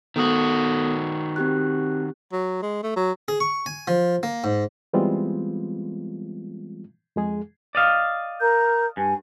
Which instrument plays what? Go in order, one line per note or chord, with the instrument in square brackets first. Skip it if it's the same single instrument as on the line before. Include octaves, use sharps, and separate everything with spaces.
[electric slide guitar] D#3 F#4 [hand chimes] B3 A4 D#6
[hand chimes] C4 G4 F#6
[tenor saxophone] F#3
G#3
A3
F#3
[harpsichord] G#4
C#6
G#5
F3
A#3
G#2
[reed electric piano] E3 G3 G#3 B3 C4 F4
F2 G#3 G#4
[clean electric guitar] D5 D#5 F5
[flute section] A#4 A#5 G6
[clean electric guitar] G2 [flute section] G#5